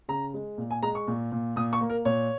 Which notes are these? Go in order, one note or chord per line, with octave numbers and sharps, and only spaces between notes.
C#3 A#5
G#3
A#2
G#5
G#3 A#5
C#6
A#2
A#2
A#2 D#6
C#6
A#3
A#4
A#2 C#5